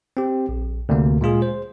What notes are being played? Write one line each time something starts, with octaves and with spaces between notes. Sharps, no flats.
C4 G4
A#1
D2 C3 A#3
A#2 G#3 F4 G#4
C5